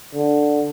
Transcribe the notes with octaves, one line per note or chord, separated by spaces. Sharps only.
D3